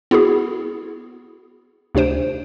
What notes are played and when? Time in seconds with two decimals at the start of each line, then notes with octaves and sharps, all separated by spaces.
0.11 B3 E4 F#4 G#4
1.95 D2 C3 D4 C5 D7